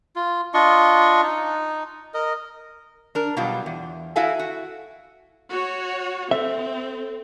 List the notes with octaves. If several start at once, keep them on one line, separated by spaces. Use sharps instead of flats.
F4
D4 F4 D#5 C#6
D#4
A#4 D#5
D4 A#4
B2 F#3 G3 F4
E2
E4 F#4 A4 E5 F5 G#5
F#4
F#4 C#5
C4 A4 E5